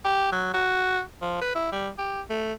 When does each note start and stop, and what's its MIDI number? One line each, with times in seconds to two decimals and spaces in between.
0.05 0.31 67
0.32 0.53 54
0.54 1.01 66
1.22 1.41 53
1.41 1.54 71
1.55 1.71 64
1.72 1.89 55
1.98 2.22 67
2.30 2.53 57